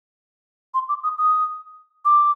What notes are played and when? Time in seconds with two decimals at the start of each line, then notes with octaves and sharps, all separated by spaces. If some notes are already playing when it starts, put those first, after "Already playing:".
0.74 C6
0.89 D6
1.03 D#6
1.18 D#6
2.05 D6